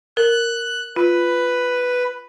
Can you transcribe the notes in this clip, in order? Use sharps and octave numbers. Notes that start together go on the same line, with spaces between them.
A#4 F#6
F4 B4